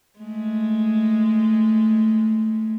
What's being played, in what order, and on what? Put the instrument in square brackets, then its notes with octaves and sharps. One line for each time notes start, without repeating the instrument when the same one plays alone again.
[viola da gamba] G#3 A3